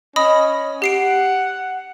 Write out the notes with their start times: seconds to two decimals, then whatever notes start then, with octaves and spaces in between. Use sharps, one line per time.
0.16 C#4 D#5 B5 D#6
0.82 G4 F#5 C7 D7